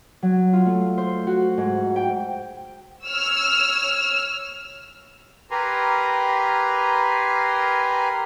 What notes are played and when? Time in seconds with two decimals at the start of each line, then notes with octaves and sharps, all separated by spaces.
0.22 F#3
0.53 F4
0.66 A3
0.98 C5
1.27 F#4
1.58 G#2
1.96 G5
3.05 C#5 E6 F6
5.51 G4 A#4 B4 G#5 A#5 C6